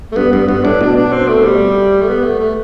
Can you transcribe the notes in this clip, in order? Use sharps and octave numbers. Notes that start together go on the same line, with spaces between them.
A3
G2 B3
G2 B3
G2 B3
A2 D4
B2 D4
D4
C4
A3
G3
A3
B3
A3
A3